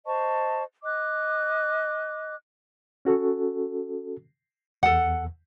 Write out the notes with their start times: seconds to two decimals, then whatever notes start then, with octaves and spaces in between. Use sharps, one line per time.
0.06 C5 D#5 A5 C#6
0.84 D#5 D6 F#6
3.05 C#4 F#4 A4
4.83 E2 A4 F#5